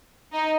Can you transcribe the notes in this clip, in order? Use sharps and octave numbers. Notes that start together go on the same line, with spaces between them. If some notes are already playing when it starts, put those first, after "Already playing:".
D#4